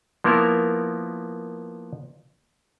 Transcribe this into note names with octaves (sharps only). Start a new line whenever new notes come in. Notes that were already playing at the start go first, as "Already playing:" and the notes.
F3 A#3 B3 E4 A#4